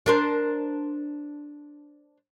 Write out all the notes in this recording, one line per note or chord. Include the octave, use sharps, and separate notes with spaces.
D4 A#4 C5